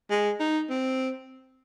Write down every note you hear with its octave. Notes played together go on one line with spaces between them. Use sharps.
G#3
D#4
C4